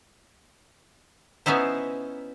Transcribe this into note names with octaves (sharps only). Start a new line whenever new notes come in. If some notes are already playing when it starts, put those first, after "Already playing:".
B3 C#4 D#4 E4 C5